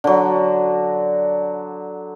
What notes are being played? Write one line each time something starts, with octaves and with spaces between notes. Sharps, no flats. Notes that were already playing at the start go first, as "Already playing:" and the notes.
D3 F#3